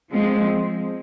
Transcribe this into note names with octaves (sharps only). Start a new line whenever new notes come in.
F3 G#3 C4